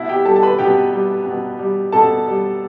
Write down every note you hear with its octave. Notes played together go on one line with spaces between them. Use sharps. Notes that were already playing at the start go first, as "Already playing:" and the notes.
Already playing: B2 E4 E5
G4 G5
G3 A4 A5
A5
B4 B5
B2 G4 G5
G3
B2
G3
B2 A4 A5
G3